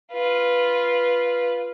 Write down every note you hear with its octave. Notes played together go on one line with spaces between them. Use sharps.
F4 B4